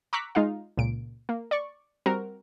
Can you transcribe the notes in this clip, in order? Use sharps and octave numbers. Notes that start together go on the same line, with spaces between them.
A#5 C#6 D6 E6 F#6 B6
G#3 D#4 F4 F5
C#2 A#2 D7
A#3
D5 C#6
G3 C4 F#4 A#4